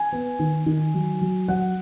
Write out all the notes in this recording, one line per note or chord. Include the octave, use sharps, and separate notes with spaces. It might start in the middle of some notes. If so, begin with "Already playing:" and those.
Already playing: G#5
B3
D#3
D#3
F#3
F#3
F#3 F#5